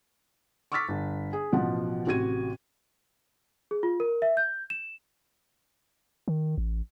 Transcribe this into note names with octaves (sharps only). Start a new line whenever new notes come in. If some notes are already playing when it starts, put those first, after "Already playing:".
C#6 D6 E6 F6 A6 B6
G1
G#4
A1 B2 F3 F#5
A1 C3 F#4 G#6 D#7
G#4
F4
A#4
E5
G6
E7
D#3
A1